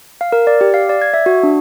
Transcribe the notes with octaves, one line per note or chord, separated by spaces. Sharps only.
F5
A#4
D5
G4
F5
D5
G#6
E5
F#4
D4